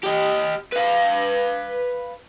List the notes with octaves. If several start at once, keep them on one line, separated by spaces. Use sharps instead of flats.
G4 D#5
B4 F5